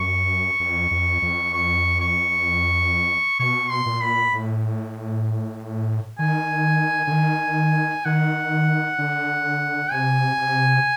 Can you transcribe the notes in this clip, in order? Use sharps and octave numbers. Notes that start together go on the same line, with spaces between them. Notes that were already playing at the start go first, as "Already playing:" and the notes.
Already playing: F#2 C#6
F2
F2
F2
C#6
C#6
B2 C#6
C6
A#2
B5
A2
D#3 G#5
D3
D#3
D#3 F#5
D3
C3 G#5
C3